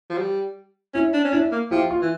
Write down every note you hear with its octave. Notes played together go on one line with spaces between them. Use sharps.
F3
G3
C#4 E4
D4
C#4
D4 E4
A#3
F3 E4 G4
F4
E3